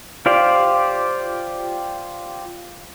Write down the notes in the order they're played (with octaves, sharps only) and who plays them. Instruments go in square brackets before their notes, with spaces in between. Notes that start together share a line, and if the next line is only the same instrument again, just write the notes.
[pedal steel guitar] F4 G4 C5 D5 F5